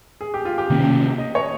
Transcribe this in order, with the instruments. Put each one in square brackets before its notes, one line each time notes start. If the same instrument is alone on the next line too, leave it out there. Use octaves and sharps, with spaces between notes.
[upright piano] G#4
G4
F4
G4
[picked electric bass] C3 D#3 A#3 C#4
[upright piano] D#5
C#5